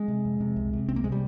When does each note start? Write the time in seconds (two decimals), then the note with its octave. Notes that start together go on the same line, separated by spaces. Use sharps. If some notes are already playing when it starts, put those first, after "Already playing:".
Already playing: G#3
0.08 C3
0.25 F2
0.40 C3
0.56 C2
0.73 C3
0.88 C2 C4
0.96 A#3
1.04 C3 G#3
1.12 G3